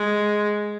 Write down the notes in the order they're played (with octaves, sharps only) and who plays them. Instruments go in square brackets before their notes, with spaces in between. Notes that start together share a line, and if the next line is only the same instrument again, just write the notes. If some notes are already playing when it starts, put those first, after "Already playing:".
Already playing: [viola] G#3